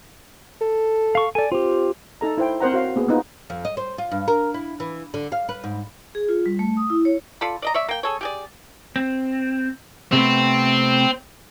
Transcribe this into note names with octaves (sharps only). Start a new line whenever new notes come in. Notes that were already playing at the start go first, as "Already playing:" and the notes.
A4
F5 C#6
A4 D5 G#5
C4 F4 G4
D#4 A4 A#5
E4 C5 G5
C4 A#4 C5 F#5 A#5
F#4 C#5 F5
A#3 B3 G#4
A#3 B3 D#4 F4
F2
D#5
C5
F4
G2
A#4
E4
E3
D3
F5
B4
G#2
G#4
F4
G3
A3
D#6
E4
C#5
F4 A4 D5 B5
D5 D#5 A#5
C#5 D5 E5
A#3 G5
G#4 A4 C#5
G4 G#4 D5
C4
C3 A3 B3 C4